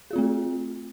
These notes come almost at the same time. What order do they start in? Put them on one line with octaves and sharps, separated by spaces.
G#4 F4 C4 A3